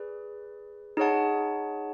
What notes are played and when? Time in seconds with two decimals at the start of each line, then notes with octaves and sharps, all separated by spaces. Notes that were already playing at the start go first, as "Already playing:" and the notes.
Already playing: G#4 B4 D5
0.97 D#4 G#4 C#5 F#5 A5